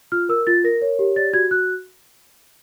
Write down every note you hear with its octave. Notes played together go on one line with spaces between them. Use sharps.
F4 F6
A#4 E6
F4 A6
A#4 A#6
C#5
G4
D5 A6
F#4 G#6
F#4 F#6